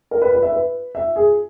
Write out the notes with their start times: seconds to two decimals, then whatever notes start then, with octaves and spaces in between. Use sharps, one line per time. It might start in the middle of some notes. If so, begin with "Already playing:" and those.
0.11 A#4
0.22 B4
0.33 B4
0.43 E5
0.53 B4
0.95 E5
1.16 G#4